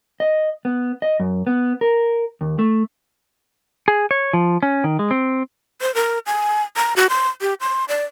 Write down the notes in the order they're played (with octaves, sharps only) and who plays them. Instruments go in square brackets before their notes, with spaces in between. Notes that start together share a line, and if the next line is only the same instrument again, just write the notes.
[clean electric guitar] D#5
B3
D#5
F#2
B3
A#4
D#2
A3
[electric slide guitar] G#4
C#5
F3
C#4
D#3
G#3
C4
[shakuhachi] C5
A#4
G#5
A#5
F#4
C6
G4
C6
D5